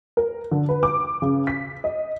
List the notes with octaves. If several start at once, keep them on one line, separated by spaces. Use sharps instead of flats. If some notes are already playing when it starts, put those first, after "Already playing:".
A#4
D3
B4
D6
C#3
B6
D#5